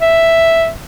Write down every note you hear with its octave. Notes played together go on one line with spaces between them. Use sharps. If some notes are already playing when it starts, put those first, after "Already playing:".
E5